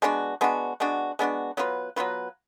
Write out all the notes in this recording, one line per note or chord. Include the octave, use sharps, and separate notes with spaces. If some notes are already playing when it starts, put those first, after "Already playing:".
G#3 B3 D4 F#4
G#3 B3 D4 F#4
G#3 B3 D4 F#4
G#3 B3 D4 F#4
F#3 B3 F4 B4
F#3 B3 F4 B4